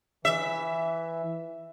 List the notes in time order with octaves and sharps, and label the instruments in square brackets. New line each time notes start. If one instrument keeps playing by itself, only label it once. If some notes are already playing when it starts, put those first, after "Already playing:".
[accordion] E3 [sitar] E5